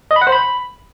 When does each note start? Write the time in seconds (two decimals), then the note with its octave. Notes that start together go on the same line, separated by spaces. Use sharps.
0.11 D#5
0.16 B5
0.21 F#5
0.27 C5
0.32 B5